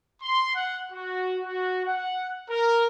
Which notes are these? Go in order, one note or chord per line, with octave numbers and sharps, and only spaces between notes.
C6
F#5
F#4
F#4
F#5
A#4